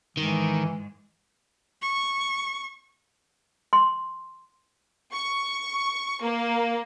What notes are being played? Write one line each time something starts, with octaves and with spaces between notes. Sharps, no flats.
G#2 D#3 E3 G#3
C#6
C6
C#6
A#3